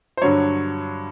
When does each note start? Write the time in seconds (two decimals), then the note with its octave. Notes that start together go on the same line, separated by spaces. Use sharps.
0.17 C5
0.22 G2 D3 F#3 C#5